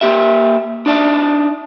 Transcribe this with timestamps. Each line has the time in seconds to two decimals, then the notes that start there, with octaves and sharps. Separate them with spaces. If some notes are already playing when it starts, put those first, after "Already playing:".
0.01 A#3 G4 E5
0.86 D4 D#4 D5 E5 A5